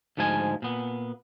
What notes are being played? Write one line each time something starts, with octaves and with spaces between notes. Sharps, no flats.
D2 G#2 F3 G#3 G#5
A#2 B3